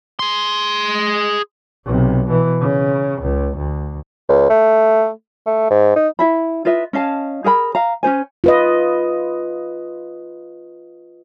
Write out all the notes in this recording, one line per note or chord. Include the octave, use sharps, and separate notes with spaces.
G#4 C6
B1 C3
B2 E3
C#3
C#2
D2
C#2
A3
A3
G#2
D#4
E4 E5 B5
F4 B4 D#5 E5
C#4 D#5 F5 A5
G#4 A#4 G5 B5
F5 A#5
C#4 D4 C5 G#5
F4 B4 D#5